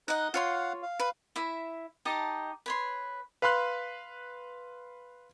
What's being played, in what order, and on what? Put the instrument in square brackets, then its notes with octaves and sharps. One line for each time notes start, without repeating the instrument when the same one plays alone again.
[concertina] D#4 F#6 [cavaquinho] D#5 F#5
[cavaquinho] F4 C#5 C6 [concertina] F5 F#5
[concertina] F5
[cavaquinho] B4
E4 E5
D#4 G4 D#5 A5
B4 C#5 C6
[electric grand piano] B4 F5 B5 C6 F#6